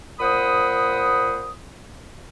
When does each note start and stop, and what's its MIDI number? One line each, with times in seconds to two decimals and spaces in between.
0.20 1.51 46
0.20 1.51 72
0.20 1.51 78
0.20 1.51 83
0.20 1.51 87